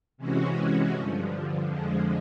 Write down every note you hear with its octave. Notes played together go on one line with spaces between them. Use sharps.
C3 E3 G#3 C#4 F#4
G2 D3 F3
F2 D3 F3 G#3